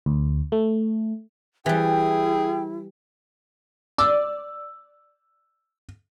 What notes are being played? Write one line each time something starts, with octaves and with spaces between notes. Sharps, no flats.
D2
A3
E3 G3 E4 G#4 G5
D5 E6